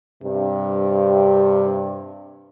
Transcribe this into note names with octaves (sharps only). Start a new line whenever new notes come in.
G2 C3